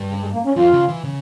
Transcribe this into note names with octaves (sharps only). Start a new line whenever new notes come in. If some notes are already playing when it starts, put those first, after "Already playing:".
Already playing: G2
C#3
G#3
A#3
C#4
F2 F4
C#3
E3
C#3